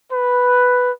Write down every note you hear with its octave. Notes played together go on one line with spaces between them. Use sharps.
B4